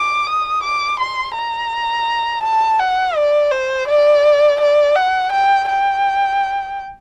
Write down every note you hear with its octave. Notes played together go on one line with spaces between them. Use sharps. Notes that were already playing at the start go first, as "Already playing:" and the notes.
Already playing: D6
D#6
D6
C6
A#5
A5
F#5
D5
C5
D5
D5
F#5
G5
G5